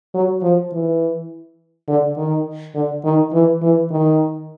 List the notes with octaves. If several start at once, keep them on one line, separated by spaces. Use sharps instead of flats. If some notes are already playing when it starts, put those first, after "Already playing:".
F#3
F3
E3
D3
D#3
D3
D#3
E3
E3
D#3